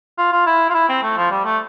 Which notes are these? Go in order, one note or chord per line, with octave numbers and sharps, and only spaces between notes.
F4
F4
E4
F4
E4
C4
A3
F3
G3
A3